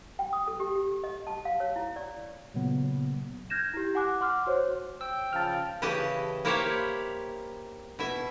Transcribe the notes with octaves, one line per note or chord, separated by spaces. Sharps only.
G5
D#6
A4
G4
G4
D#5
A5
F5
C#5
E4
D5
A#2 C#3 F#3 A#3 B3
F6 G6 G#6 A#6 E7
E4 G4
F#5 G#5 D6 F#6
F#5 C6 D6 F6
F#4 C5 C#5
G5 E6
C#3 F3 A5 F6
C#3 E3 G4 D#5 A5
A#3 E4 G4 C5 C#5 F5
B2 E4 E5